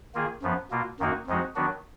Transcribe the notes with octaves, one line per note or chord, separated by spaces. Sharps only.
D#3 A#3 F4 G#4
F#2 F3 B3
B2 A#3 F4
F#2 D#3 A#3 D#4 F#4
F2 F3 G#3 D#4 F#4
D#3 F#3 B3 D4 F#4